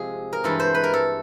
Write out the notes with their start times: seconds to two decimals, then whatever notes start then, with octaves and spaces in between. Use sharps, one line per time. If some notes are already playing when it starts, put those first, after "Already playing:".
Already playing: C3 F3 G#3 G#4
0.33 A#4
0.44 G2 E3 G#3 A4
0.60 C5
0.74 B4
0.84 A#4
0.94 A4